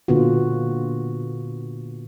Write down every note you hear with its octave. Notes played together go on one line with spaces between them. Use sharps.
A#2 D3 B3 F4 F#4